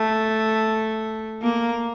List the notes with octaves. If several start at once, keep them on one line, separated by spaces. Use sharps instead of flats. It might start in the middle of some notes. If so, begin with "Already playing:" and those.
Already playing: A3
A#3